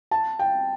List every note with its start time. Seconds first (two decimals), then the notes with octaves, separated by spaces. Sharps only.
0.11 A5
0.39 G5